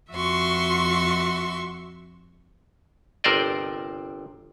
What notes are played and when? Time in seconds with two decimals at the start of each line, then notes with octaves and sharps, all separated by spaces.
0.11 F2 F#4 E5 C6 C#6
3.24 G1 C3 A#4 C5 D5 D#5